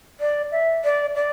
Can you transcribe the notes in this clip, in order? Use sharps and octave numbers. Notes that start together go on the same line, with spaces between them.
D5
E5
D5
D5